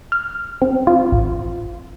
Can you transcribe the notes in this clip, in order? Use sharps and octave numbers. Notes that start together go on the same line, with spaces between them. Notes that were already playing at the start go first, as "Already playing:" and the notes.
F6
C4
F4
A1